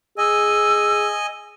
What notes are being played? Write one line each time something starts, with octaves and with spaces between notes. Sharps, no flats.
G#4 D#5 G#5 E6